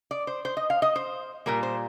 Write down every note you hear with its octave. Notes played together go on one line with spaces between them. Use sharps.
D5
C5
C5
D#5
F5
D#5
C5
A#2 G3 A#3 A#4
C5